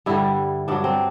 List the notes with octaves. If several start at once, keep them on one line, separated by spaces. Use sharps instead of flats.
G2 D3 G3 E4
G2 F#3 D4
C4